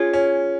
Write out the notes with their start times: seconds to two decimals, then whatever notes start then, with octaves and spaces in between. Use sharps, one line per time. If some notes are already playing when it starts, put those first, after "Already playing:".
Already playing: C#4 F4 G#4
0.14 C#4